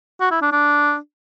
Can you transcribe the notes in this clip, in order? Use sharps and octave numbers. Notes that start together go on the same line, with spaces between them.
F#4
E4
D4
D4